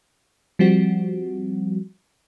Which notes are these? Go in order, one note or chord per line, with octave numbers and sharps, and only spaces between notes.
F3 G3 C4 F#4